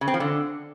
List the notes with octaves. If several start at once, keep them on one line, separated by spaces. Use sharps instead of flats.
C#3
C4
F3
D3